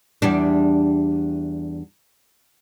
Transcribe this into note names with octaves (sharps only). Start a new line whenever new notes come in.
E2 G3 D4